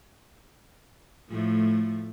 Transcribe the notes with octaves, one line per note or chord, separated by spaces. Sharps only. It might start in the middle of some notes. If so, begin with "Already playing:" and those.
A2 F3 A3